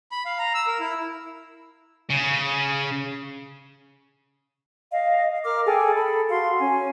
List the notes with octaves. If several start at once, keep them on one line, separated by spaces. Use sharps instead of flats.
B5
F5
A#5
E6
A#4
E4
C#3
D#5 F5
A#4 D6 F6
G#4 A4 G5
A4 B5
F#4 F5 C6
C#4 G#5